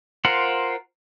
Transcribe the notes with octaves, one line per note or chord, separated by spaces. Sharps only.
F4 A#4 C5 F#5